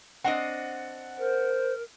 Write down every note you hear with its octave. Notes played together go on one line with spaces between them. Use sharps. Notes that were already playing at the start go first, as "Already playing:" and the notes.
C4 D4 D#5 F#5
A#4 C5